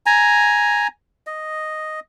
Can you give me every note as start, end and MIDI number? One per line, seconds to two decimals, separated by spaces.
0.06 0.87 80
0.06 0.87 82
1.27 2.00 75